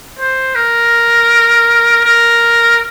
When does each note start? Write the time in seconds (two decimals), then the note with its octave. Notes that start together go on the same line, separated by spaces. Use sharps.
0.19 C5
0.55 A#4
2.05 A#4